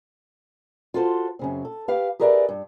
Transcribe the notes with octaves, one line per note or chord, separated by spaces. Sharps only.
F4 F#4 A4 C5
F#2 C#3 C4
A4
G4 B4 F5
G4 G#4 A#4 B4 D5 E5
G2